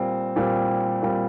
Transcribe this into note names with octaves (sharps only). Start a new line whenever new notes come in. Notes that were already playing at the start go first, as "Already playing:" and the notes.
Already playing: A#2 G3 C4
A#2 G3 C4
A#2 G3 C4